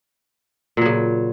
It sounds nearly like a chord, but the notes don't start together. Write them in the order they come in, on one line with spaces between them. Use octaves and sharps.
A#2 F#3 C#3